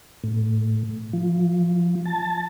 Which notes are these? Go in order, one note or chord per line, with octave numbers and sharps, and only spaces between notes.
A2
F3
A5